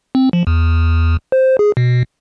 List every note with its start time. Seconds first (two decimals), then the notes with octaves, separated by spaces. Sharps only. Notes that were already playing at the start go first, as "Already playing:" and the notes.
0.15 C4
0.33 F3
0.47 E2
1.32 C5
1.59 G#4
1.77 B2